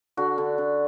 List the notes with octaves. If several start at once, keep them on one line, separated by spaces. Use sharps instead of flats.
D3 F#4
D3
D3